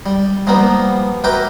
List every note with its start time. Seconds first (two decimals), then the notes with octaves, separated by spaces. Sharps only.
0.06 G3
0.47 F3 G3 A#3 B3 D#4
1.24 F#2 A#4 B4 G5 D6